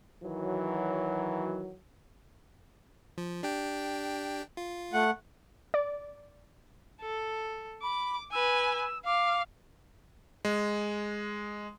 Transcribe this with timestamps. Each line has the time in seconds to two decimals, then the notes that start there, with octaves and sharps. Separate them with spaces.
0.23 D#3 E3 F#3
3.18 F3
3.43 D4 G4 G5
4.57 F4
4.93 A3 F#5
5.74 D5
7.01 A4
7.82 B5 D6
8.32 B4 G#5 E6
9.05 F5 D6
10.45 G#3